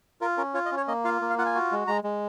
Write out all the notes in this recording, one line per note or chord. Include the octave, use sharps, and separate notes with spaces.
F4 A#4
C#4 A#4
F4 C#5
D#5
C#4
C#5
A#3 D#5
F4 F5
A#3
F5
F4 F#5
G#5
F#4
G#3
G#3 A#5
G#3